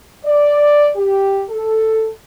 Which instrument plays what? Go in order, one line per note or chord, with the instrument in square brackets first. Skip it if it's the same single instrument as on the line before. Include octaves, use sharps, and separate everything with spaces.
[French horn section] D5
G4
A4